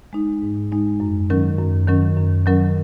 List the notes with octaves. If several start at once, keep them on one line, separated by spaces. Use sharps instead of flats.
G#3 D#4
G#2
G#3 D#4
F#2
D#3 F#3 C#4 A#4
F#2
D#3 F#3 C#4 A#4
F#2
D#3 F#3 C#4 A#4